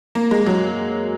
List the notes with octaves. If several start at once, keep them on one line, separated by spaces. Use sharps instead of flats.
A#3
G#3
F#3